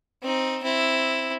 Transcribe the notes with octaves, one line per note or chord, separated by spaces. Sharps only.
C4 D#4
C4 E4